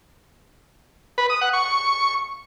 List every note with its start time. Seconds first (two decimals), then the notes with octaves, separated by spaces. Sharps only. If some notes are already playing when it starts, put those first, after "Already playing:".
1.18 B4
1.30 D#6
1.41 F#5
1.53 C#6